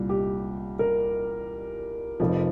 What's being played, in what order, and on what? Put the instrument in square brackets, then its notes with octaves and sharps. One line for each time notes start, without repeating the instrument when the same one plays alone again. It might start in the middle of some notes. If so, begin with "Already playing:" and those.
Already playing: [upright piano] C2 A#2 G3
G4
A#4
F1 F2 F3